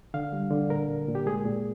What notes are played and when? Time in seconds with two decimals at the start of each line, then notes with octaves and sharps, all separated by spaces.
0.14 D3 F5
0.33 G3
0.51 D3
0.70 A#2 A#4
0.89 A#2
1.08 A#2
1.15 G4
1.26 G#3 G#4
1.45 A#2